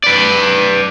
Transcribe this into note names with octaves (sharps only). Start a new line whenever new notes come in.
B4 D5